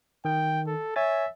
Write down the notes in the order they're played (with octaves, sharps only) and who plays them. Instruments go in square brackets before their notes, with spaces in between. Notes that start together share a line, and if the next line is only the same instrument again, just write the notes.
[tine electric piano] D#3 [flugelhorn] G5
[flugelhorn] A4
[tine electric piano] C#5 G#5 A6 [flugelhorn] E5